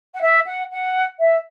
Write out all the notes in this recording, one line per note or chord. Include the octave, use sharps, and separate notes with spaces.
F#5
E5
F#5
F#5
E5